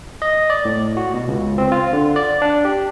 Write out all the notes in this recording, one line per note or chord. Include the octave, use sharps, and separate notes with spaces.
D#5
D5
A2
F#4
B2
C#2
C4
F4
D3
D5
D4
G4